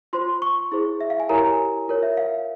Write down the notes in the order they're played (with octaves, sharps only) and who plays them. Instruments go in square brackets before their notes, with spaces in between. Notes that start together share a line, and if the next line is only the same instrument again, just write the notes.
[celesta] F4 C5 C6
C#6
E4 G#4 C5
E5
F5
G#5
E4 G4 A#4 C#5 A#5
G#5
F4 A#4 C#5
E5
F5